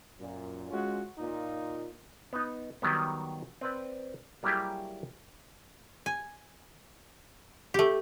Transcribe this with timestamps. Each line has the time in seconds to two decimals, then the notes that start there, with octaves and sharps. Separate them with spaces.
0.20 F#2 A#2
0.71 G#3 C#4 F4 F#4
1.18 A#2 D#4 F4
2.33 B3 D#4
2.82 D#3 F#3 G3 B3
3.61 C4 B4 D5
4.43 F#3 G3 A#3 E4 G4 G#4
6.06 G#5
7.74 A3 G4